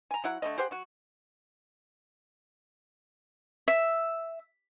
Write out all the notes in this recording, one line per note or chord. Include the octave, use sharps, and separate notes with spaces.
G#5 A#5
F#3 E4 F#5
D3 A3 D#5
G4 G#4 C5 F#5
F#3 F#4
E5